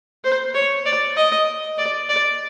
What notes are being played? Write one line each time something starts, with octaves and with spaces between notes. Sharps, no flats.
C5
C#5
D5
D#5
D5
D5